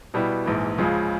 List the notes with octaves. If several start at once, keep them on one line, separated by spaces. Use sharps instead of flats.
B2 G3 B3 E4
A#1 G#2 E3
C#2 C#3 F3 G#3